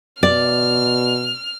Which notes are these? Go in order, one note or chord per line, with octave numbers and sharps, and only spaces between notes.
B2 D5 F6